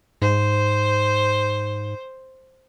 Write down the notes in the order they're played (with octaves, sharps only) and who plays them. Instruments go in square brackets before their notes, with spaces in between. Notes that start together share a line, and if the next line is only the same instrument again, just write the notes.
[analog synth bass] G#2 [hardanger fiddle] C5